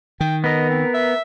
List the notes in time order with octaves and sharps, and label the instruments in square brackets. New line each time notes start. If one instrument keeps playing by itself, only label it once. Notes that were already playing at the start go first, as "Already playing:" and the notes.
[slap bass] D#3 [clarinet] G5
[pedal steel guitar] B3 A#4 [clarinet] D#5
[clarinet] C4
E5